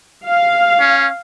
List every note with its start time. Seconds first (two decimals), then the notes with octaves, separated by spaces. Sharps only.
0.25 F5
0.80 C#4